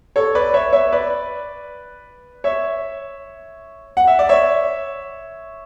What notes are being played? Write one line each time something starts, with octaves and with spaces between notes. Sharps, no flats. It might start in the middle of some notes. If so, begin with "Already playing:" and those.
A4 C#5
B4 D5
C#5 E5
C#5 E5
B4 D5
C#5 E5
F#5
E5
D5
C#5 E5